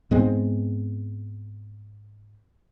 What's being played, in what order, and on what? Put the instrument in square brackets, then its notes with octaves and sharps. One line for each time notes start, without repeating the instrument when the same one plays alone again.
[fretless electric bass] G#2 G#3 B3 C4